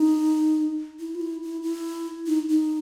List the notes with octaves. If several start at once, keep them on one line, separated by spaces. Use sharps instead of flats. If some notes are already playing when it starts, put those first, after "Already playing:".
Already playing: D#4
E4
F4
E4
E4
E4
D#4
D#4